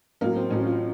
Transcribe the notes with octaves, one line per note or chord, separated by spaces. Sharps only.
A1 A2 F#3 A#3
C4
A1 A2 F#3 C#4
F4